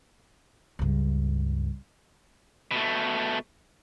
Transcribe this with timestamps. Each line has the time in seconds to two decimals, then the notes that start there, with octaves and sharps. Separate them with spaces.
0.79 C#2 G2
2.71 B2 A3